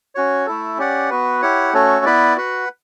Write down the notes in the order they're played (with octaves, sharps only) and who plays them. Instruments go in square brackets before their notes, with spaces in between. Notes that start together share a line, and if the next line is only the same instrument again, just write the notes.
[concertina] C#4 F#4 C#5
A3 E4 A4
C#4 G4 D5 F#5
B3 F#4 B4
E4 G4 C#5 F#5
A3 C#4 F#4 A4 C#5
B3 E4 B4 D5
F#4 B4 F#5